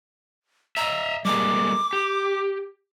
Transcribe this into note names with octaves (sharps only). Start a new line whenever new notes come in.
D#5 E5 A#5
G3 G#3 A#3 D6
G4